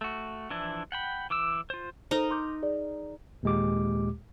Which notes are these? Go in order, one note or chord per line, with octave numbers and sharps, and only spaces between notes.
A3 F#4
E3 F3 D4 E4
F#5 G5 B5
E3 D6 E6
F4 C5
D#4 A4 A#4 C5
C6 D6 G6
G#4 D5
D#2 A#2 G#3 G4 D6